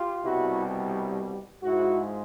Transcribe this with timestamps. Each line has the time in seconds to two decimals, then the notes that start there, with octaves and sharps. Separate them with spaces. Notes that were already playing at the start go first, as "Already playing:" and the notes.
Already playing: F4 G4
0.24 C2 B2 G3 E4 F#4
1.63 G#2 F3 G#3 E4 F#4